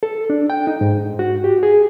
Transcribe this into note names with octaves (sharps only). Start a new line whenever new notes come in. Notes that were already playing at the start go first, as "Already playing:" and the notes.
A4
D4
G5
D#4
G#2
F#4
G4
G#4